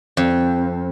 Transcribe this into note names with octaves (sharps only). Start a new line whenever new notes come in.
F2